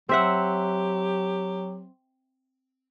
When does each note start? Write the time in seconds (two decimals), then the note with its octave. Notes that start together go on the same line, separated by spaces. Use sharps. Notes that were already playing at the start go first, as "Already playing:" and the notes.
0.09 F#3 C4 G4 E5 F#5